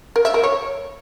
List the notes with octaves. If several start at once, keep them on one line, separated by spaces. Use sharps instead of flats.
A#4
E5
A#4
C#5